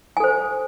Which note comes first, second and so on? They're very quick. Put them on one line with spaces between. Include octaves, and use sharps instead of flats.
G#5 A4 C5